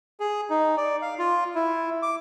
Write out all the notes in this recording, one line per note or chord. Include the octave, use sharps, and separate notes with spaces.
G#4
D#4
D5
F5
F4
E4
D6